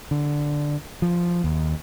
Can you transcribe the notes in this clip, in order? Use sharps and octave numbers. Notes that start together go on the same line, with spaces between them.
D3
F3
D#2